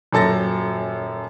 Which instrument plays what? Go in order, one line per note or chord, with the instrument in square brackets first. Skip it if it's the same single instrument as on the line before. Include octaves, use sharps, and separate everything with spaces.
[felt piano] D#1 F#2 A4 A6 A#6